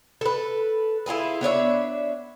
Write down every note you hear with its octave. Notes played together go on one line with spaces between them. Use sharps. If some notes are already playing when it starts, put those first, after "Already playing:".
A4 B4
E4 F4 G#4 B4
B3 D4 C#5 E5